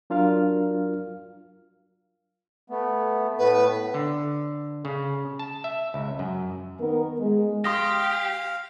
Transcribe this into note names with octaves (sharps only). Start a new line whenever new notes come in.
F#3 D4 F4 A#4 F5 F6
A3 B3
A2 A3 B3 B4
D3
C#3
A5
E5
C#2
F#2
D#3 B3 A#4
G#3
G4 F5 C6 D#6 A#6